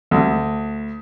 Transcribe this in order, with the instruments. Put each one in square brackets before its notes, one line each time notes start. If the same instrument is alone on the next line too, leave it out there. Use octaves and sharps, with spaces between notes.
[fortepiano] D2